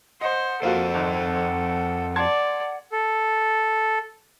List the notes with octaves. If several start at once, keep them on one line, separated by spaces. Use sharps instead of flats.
C5 D#5 F#5
F2 A#3 F4 F#4 A4 C5
G#1
D5 A5 C6 G#6
A4